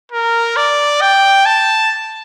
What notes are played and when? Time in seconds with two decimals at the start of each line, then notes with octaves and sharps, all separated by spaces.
0.12 A#4
0.56 D5
1.01 G5
1.46 A5